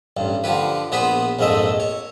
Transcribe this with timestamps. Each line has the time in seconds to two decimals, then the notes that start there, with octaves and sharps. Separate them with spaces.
0.17 A1 G2
0.44 D3 F3 G4 B4
0.92 A#1 B3 G#4 B4 C5 B5
1.39 A#1 F2 G#2 A3 D#5 E5
1.80 C#5